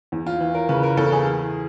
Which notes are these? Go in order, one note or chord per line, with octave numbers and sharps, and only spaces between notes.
E2
F4
E3
A#4
C#3 B4
A#4
E2 A4
G#4
E3